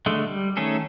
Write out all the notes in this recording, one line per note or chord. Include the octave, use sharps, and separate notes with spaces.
D3 G#3 A3
G3
D#3 A3 C#4 G#4 A4